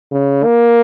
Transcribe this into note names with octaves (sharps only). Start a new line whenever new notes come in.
C#3
A#3